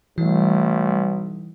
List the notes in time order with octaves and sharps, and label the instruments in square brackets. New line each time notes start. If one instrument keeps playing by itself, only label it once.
[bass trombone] B1 [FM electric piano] E3 [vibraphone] G3 [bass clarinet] A3